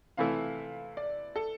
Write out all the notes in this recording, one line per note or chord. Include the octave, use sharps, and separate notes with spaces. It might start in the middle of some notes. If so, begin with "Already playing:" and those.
C3 E3 A3 E4 F5
D5
A4